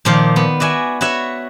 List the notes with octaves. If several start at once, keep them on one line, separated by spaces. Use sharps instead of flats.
A#2 D#3 F3 D5 F5
B3
F#4 D5 E5 G#5
F#4 B4 C#5 E5